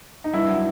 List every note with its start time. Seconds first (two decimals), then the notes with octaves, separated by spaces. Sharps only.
0.24 D#4
0.34 G2 E4
0.49 F#3